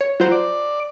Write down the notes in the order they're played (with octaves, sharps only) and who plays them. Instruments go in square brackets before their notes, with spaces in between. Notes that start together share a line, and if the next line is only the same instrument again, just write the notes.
[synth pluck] C#5
[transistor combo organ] F#3 [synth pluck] F4 C5 A#5
[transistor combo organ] D5